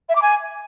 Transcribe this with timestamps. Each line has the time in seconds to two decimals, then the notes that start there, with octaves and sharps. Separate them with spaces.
0.09 E5
0.15 D6
0.22 G#5